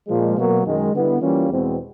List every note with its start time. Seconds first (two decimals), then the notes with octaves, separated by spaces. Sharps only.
0.08 A#2 F3 G#3
0.36 B2 F#3 A#3
0.64 F#2 D#3 G#3
0.93 D3 G3 B3 E4
1.21 E3 G3 A#3 C#4 F4
1.49 E2 B2 G#3 C4